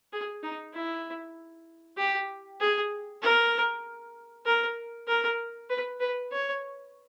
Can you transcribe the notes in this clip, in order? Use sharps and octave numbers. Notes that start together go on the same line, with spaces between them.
G#4
D#4
E4
G4
G#4
A#4
A#4
A#4
B4
B4
C#5